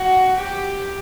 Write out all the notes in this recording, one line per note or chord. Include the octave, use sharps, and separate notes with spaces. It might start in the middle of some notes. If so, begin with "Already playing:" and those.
Already playing: F#4
G4